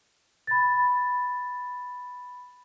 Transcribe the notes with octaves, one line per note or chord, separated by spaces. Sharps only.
B5 A6